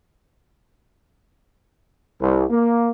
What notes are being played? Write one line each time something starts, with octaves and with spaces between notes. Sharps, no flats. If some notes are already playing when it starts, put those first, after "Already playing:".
C2
A#3